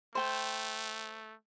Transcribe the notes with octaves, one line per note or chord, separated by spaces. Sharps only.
A3 C5 G5